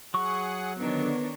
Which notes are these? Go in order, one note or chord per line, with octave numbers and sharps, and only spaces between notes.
F#3 G#4 F#5 C#6
D3 D#3 B3 D4 C#5